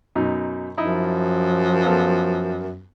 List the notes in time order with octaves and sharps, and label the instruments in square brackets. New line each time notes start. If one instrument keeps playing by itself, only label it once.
[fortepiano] F#2 B2 D#4
[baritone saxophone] F#2 [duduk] F3 [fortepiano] D#4 E4 D#5
[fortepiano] B3 F4 A4